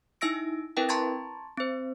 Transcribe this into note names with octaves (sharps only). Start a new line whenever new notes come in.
D#4 E4 E5 E6 A#6 D7
C4 E4 A#4 B4 E5 G5
A5 A#5 C6 C#6 G#6 A6
C4 C5